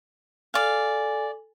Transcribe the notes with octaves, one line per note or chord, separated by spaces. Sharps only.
A4 D5 F5 G#5